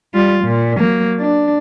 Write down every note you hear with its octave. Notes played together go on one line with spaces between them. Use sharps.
G3 F4
A#2
F#3 A#3
D4